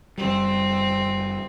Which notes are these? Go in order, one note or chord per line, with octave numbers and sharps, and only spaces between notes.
F#1 G3 C4